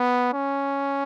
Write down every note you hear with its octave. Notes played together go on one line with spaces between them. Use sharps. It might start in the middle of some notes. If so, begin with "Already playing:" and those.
Already playing: B3
C#4